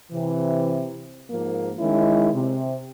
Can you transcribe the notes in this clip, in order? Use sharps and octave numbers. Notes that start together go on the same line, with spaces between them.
C3 E3
G#2 F3 A#3
D#3 G#3 C#4 E4
C3